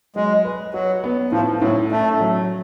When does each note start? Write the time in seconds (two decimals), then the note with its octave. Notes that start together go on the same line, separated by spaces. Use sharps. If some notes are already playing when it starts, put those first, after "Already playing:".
0.16 F#3 G#3
0.45 B4
0.74 F#3 F#4
1.04 B3
1.32 A2 F3
1.62 A2 F#3
1.91 A3 C#4
2.21 F#3